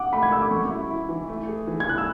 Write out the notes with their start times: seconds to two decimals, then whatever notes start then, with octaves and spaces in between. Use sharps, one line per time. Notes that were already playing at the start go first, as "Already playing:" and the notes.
Already playing: F#5 D6
0.13 A3 B5
0.23 G#6
0.31 A3 E6
0.42 D6
0.51 F#2 C#6
0.71 E4
0.91 E4
1.09 E3
1.29 A3
1.48 G#4
1.67 E3
1.80 G#6
1.87 E4 F#6
1.98 E6